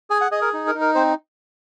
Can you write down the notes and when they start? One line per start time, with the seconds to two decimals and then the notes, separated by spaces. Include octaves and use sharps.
0.10 G#4 G#5
0.21 F#5
0.31 G#4 D#5
0.42 A#4
0.53 D#4
0.67 A#4
0.75 D#4
0.81 A#4
0.95 C4 C5